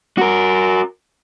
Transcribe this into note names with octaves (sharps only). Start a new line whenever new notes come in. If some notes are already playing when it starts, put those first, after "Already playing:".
F#4 A#4